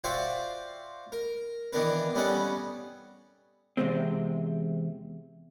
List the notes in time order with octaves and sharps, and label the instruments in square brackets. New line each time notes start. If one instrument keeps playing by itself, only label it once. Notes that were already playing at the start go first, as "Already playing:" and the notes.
[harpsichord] F4 F#4 C5 D5 E5 G5
A#4
D#3 E3 B3 D4 A#4 B4
G3 B3 C#4 D#4 A4 F#5
[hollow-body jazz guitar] E2 G2 C3 G#3 C4